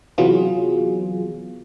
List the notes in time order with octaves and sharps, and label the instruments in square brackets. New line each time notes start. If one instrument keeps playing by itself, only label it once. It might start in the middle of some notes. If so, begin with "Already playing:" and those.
[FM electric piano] C3 E3 F#3 B3 F4 G#4